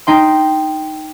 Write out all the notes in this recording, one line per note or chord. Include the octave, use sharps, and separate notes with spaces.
D#4 G5 C6